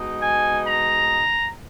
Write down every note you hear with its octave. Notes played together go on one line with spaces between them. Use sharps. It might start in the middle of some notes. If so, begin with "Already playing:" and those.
Already playing: B2 G#3 D#4
G#5
A#5